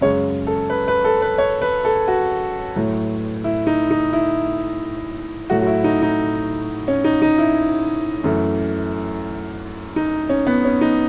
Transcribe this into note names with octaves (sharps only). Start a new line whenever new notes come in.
F#2 C#3 G#3 C#5
A4
B4
B4
A4
B4
C#5
B4
A4
F#4
A2 F#3 A3
E4
D#4
D#4
E4
A2 F#3 A3 F#4
F#4
E4
D#4
D#4
C#4
D#4
D#4
E4
F#2 E3 A3
D#4
C#4
B3
C#4
D#4